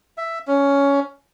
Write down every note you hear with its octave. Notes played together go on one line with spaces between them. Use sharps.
E5
C#4